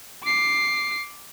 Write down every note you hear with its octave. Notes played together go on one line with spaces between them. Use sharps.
D6 C7